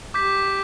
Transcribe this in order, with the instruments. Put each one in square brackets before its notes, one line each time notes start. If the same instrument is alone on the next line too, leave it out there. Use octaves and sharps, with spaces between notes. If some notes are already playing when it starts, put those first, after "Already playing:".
[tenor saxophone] G4 [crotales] D6 G6 B6